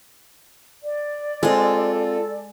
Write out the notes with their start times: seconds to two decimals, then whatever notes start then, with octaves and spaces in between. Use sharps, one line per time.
0.83 D5
1.43 G#3 C4 F4 A4